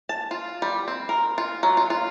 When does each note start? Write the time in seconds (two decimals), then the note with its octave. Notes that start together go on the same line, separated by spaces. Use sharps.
0.09 A5
0.31 F4
0.62 G3
0.88 C4
1.09 A#4
1.38 F4
1.63 F#3
1.77 F4
1.90 F4